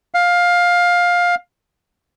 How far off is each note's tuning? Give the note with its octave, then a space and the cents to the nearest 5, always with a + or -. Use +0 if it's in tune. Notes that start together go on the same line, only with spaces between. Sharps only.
F5 +15